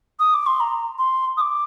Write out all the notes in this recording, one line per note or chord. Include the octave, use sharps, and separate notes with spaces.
D#6
D6
C6
A#5
C6
D#6
D6